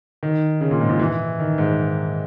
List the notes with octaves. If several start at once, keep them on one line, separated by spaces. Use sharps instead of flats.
D#3
C#3
A#2
G#2
A#2
E3
D#3
G#2